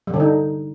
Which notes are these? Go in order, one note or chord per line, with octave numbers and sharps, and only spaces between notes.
G3
D3
D#4